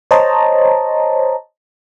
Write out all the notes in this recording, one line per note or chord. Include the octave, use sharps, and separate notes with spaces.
C5 C#5 D#5 A5 A#5